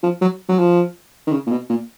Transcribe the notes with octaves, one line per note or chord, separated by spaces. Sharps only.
F3
F#3
F#3
F3
D#3
C#3
A#2
B2
A#2